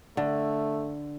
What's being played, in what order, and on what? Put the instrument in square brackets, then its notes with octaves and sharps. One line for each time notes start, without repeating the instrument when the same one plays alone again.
[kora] D3 [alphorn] A3